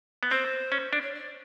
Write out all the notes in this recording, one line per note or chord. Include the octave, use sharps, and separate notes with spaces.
B3
C4 C5
C#4
D4
C#5
D5